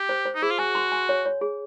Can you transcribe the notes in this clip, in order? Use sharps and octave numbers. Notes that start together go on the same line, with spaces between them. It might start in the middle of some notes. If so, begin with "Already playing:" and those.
Already playing: G4
C5
C5
D#4
E4 G#4
F4
F#4 G#5
C6
G#5
C#5
C#5
G#4